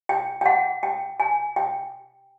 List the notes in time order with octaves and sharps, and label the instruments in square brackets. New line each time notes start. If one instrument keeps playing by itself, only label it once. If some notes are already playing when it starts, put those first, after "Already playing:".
[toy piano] G5
G5
F#5
G5
G#5
G5